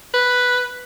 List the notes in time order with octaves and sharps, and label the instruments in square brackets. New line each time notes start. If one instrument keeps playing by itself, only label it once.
[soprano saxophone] B4